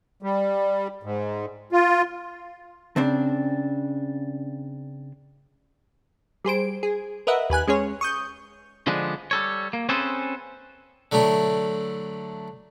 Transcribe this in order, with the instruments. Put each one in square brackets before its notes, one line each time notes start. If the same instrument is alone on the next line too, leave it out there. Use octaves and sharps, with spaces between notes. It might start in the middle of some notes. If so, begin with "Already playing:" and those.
[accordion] G3
G#2
F4
[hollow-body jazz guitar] C#3 C4 D4
[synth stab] G3 G#4 C5 D7
G#4
A#4 B4 D#5 E5 F#5
D#2 B4 G#5 F#6
G#3 C#4 G#4 C#5
C#6 D#6 G6
[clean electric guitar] D3 F3 G#3 B3 D4
G3 A4 C#5
A#3
C4 C#4 G#4 A4 B4 C5
[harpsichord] D3 F#3 A3 D4 E4